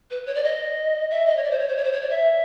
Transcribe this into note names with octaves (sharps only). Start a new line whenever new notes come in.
B4
C#5
D5
D#5
E5
D#5
C#5
D5
C5
C#5
C5
C#5
C5
C#5
D5
E5